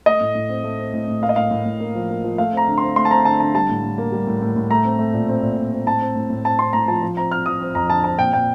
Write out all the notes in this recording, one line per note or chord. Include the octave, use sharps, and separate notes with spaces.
A3 D#5
A2
A2
C4
A3
C4
A2
A2
A#3 F5
D#5
A2 F5
A2
A2
A#3
F3
A#3
F3
A3 F5
C4 A#5
D3
C4 C6
A3 C6
A5
C4 A#5
D3 A5
D3 A5
G3 A5
A2
A2
A#3
G3
A2
A2
A2
A3 A#5
C4
A3
A#2
C4
A#2
A#2
C4
A2 A5
C4
A2
A2
C4 A5
C4 C6
A2 A#5
F3 A5
F3
C4 A#5
C4 F6
F3 D#6
C4
F2 A#5
D3 A5
C4 A5
A#2 G5
A#2 G5